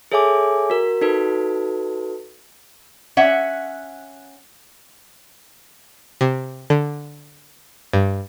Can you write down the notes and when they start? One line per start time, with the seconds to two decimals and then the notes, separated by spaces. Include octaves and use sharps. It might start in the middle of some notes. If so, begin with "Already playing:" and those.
0.12 G#4 A4 C#5 E5 G#5 D6
0.70 F#4 A#4
1.01 D#4 F#4 A4 B4
3.17 C#4 E5 F#5
6.21 C3
6.70 D3
7.93 G2